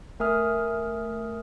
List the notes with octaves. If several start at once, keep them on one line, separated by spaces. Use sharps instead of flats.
A3 A#4 E5 G#5 D#6 F6